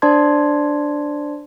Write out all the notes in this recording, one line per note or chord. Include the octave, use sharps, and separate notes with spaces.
D4 C5 D5 A5 C6 G#6